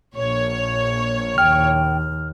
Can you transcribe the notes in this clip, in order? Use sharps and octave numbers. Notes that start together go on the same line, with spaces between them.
A#1 C#5
D#2 G5 F6